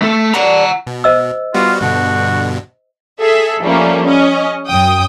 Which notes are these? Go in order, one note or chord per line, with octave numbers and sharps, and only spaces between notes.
A3 A4
D4 G4 A#4 F#5 A#5
B2
C5 D#5 E6
G3 B3 F4 F#4
G2 B2 D3 F#4
G#4 A4 E5
F3 G3 A3 A#3 C#4
C#4 D#5
F#2 G5 D#6